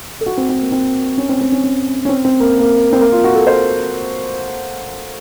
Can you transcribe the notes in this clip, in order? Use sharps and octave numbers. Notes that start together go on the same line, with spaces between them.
A4
F#4
C4
C4
A#3
C4
C#4
C4
C4
C#4
C#4
C#4
C4
C4
A#3
A#3
C4
A#3
F4
F#4
A4
C5